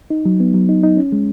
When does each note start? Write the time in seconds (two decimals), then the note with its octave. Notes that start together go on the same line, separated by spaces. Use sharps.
0.10 D#4
0.26 F#3
0.40 B3
0.54 F#3
0.69 D#4
0.83 D#4
0.97 C#4
1.12 G#3